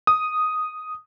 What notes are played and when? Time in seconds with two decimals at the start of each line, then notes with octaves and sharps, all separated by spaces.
0.07 D#6